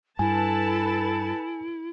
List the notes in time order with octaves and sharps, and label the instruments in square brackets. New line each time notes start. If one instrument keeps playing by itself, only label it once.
[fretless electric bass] G2 [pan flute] E4 [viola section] A4 B4 A5 [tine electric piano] G#5